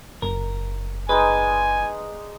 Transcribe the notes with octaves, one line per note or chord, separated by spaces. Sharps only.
F#1 A#4
G#3 D#4 B4 D5 G#5